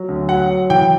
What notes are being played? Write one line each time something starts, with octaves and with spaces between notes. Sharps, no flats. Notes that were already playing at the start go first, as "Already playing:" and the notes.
Already playing: F#3
D2
F#3 F#5
F#3
E3 G5